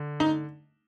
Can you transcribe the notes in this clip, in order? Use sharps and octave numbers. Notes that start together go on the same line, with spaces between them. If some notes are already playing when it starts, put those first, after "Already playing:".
Already playing: D3
D#4